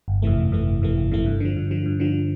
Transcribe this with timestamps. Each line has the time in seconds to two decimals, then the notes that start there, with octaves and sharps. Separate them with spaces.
0.08 G1
0.22 F2 C3 E3 A3
0.38 G1
0.52 F2 C3 E3 A3
0.67 G1
0.82 F2 C3 E3 A3
0.97 G1
1.11 F2 C3 E3 A3
1.26 G2
1.40 D3 F3
1.56 G2
1.71 D3 F3
1.86 G2
2.00 D3 F3